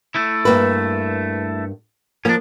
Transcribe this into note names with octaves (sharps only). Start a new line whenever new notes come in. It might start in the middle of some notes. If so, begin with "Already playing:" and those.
A3 E4
G2 A#3 B4
F3 A#3 C#4 D4